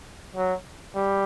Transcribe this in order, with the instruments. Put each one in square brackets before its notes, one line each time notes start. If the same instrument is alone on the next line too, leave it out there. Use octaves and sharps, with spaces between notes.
[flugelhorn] F#3
G3